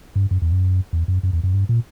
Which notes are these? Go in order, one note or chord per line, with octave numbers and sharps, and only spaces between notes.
G2
F#2
E2
F#2
E2
F#2
F#2
E2
F#2
G2
A#2